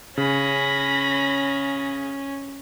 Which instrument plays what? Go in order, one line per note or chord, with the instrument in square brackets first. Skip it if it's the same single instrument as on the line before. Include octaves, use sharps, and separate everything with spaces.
[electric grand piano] C#3 [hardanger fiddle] C#4 [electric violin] B5 A#6